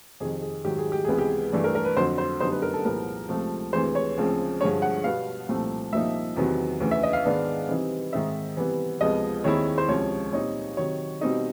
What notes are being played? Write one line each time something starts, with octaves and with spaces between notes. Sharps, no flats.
F2 C3 D#3 G#4
G#4
G#2 D#3 F#3 G4
G#4
G4
C#2 C3 E3 G#3 B3 G#4
G4
G2 E3 A3 D4
A#4
A#4
B4
F2 D3 F#3 C5
C5
F#2 D3 G3 B3 D#4 C5
B4
A#4
A4
C2 A#2 F3 G#3 B3 A#4
C#2 C3 F3 A3 C4
D2 C3 E3 G#3 C5
C#5
D2 C#3 F3 G#3 C4
G2 D3 F3 G#3 C#5
F#5
B2 G3 B3 F5
C2 A#2 F3 A3 C4
C2 A#2 F3 A#3 D#4 E5
E2 C3 D#3 F#3 B3
D2 C#3 E3
E5
D#5
F5
G#2 D#3 G#3 B3 D4
C3 E3 G3 C4 D#4
G#2 D#3 G#3 C4 D#4 E5
C3 E3 G3 B3
C#2 C3 F3 G#3 B3 D#5
D#2 D#3 G#3 C4 E4 C#5
C5
C#2 C3 F3 G#3 C#4 C#5
A#2 G3 C4 D#4 C#5
C3 D#3 F#3 C#5
B2 G3 C4 D#4